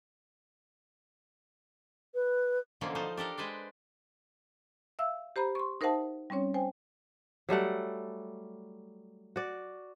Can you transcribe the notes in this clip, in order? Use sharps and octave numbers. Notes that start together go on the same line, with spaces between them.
B4
B2 D3 E3 F3 A#3 C#4
F3 D#4 C5 A5
D4 G4 A4 A#4
G#3 B4 C5 D5
E5 F5 E6
G4 C5 A#5 B5
C6 C#6
D#4 A#4 C5 E5 F#5 A5
G3 C4 C#4 C#5
C5 G5 G#5
F#3 G3 A3 F#5
F#4 D5